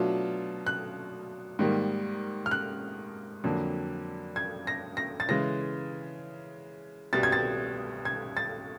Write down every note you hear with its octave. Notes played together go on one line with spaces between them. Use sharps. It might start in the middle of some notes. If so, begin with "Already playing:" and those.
Already playing: B2 F#3 A3 D4 F4
F#6
G#2 D#3 G3 A#3
F6
F#6
F2 D3 F#3 A#3
G#6
A#6
A#6
A6
C#3 E3 G#3 A#6
C2 B2 G3 A6
G#6
A6
G#6
A6